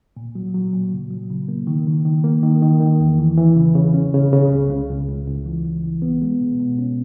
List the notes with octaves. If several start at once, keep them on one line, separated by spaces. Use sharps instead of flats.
A#2
F#3
F#3
A#2
C#3
F#3
C#3
A#3
D#3
D#3
D#3
A#3
D#3
D#3
D#3
E2
E3
E3
C#3
C#3
C#4
C#3
C#3
C#2
C#2
C#2
C#2
C#2
E3
C#2
E3
B3
G#3
B2
B2
C#4